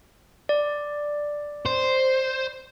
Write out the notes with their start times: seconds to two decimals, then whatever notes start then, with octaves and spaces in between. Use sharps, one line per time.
0.49 D5
1.66 C5